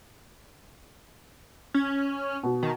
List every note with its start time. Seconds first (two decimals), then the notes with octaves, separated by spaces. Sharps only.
1.74 C#4
2.43 B2
2.63 D#3